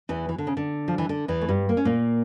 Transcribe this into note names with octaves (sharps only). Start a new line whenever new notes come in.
E2 E3
E3
D3
C#3
D3
F3
E3
D3
E2 E3
A3
G2 G3
A#3
C#4
A#2 A#3